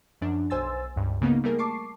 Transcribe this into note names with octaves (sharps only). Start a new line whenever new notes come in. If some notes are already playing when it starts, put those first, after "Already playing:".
F#2 F3 D4
B1 C5 G#5 C6 E6 A6
C#2 G2
C#3 A#3 B3 D#4
G3 A3 A#3 G#4 A#4
A5 C#6 D6 C7